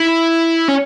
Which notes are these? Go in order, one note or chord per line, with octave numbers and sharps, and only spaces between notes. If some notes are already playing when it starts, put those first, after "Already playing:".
Already playing: E4
C#4